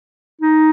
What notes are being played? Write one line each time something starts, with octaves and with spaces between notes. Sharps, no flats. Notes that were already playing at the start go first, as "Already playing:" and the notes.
D#4